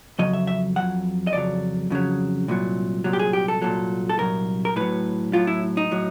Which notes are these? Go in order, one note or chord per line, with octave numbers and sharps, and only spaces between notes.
F2 C#3 F#3 D#5
E5
E5
F2 C#3 F#3 F#5
D#5
F2 C#3 F#3 D5
F2 C#3 F#3
C2 A#2 F#3
C2 A#2 F#3
G4
G#4
G4
A4
C2 A#2 F#3 A4
A4
C2 A#2 F#3 A#4
A#4
A2 F#3 B4
A2 F#3 F4
E4
D#4
A2 F#3